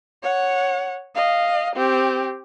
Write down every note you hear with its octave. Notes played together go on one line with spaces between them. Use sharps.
C#5 F#5
D#5 F5
C4 G4